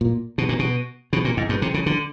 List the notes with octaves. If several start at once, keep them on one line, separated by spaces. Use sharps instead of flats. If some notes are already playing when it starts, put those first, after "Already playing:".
A#2
B2
A#2
B2
B2
A#2
G#2
G2
C3
C#3
D3